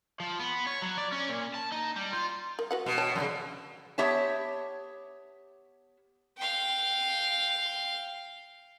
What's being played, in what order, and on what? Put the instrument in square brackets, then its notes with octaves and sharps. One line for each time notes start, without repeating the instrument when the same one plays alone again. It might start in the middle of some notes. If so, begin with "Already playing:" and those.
[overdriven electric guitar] F3
B3
C#5
F#3
D5
C#4
A#2
A5
D#4
G3
F4
[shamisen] A#4
F#4 B4 F#5
[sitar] B2
[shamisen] C#5 G5 A5
[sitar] F#2 C#3
[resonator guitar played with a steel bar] B3 G4 C#5 E5 A5
[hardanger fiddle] F5 G5